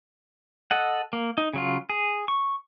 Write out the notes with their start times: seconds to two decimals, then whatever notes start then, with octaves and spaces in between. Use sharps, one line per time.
0.71 A4 D#5 F#5
1.13 A#3
1.38 D#4
1.53 C#3 F#3 F4
1.90 G#4
2.28 C#6